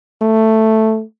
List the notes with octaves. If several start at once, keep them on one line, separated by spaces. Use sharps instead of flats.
A3